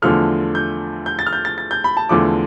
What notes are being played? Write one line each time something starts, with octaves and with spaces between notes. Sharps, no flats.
E2 D3 F3 A3 F6
G6
G6
A6
F6
G6
A6
A6
G6
B5
A5
E2 D3 F3 A3 D6